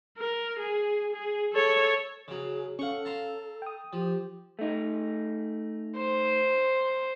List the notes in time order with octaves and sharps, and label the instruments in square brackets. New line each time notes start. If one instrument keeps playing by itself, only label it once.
[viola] A#4
G#4
G#4
A4 C#5
[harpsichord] C#3 F#3 [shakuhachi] G#4
[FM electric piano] C#4 F5 [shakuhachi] A4 [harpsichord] F#5 C#6
[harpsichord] A5 A#5 C6
[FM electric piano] G5 D#6
[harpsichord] F3 [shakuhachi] G4
[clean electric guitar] A3 D#4
[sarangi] C5